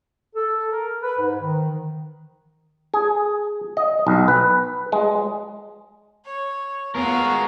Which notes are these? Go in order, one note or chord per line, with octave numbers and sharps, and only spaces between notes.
A4
A#4
B4
G#2
D#3
G#4
D#5
B1
B4
G#3
C#5
B3 F4 F#4 G#4 A#4